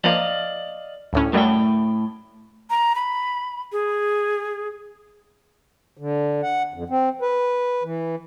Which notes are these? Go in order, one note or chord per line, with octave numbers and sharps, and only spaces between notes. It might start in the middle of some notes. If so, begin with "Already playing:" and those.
F3 A#3 D5 D#5 F5
D2 A2 C#4
F#2 A2 F#3 G3 A3 G5
A#5
B5
G#4
D3
F#5
F2
C4
B4
E3